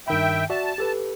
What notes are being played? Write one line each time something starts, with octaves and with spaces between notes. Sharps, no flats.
G2 D#3 E5 G5 B5
F#4 D5 E5 A5
G4 A4 B4